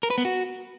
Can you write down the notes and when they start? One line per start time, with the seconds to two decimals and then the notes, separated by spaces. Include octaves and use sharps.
0.03 A#4
0.10 B4
0.18 B3
0.25 F#4